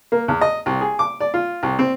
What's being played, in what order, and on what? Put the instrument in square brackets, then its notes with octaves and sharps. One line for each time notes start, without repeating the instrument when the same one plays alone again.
[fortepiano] A#3
E2
D#5
C2
G#4
D6
D5
F4
C2
C4